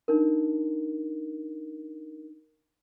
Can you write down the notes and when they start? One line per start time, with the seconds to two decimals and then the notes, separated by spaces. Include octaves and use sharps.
0.08 D4 D#4 A#4